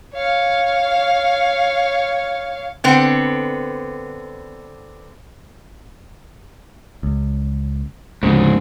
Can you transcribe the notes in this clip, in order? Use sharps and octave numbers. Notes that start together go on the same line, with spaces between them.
C#5 F5
D3 B3 C4
C#2
D2 G#2 C#3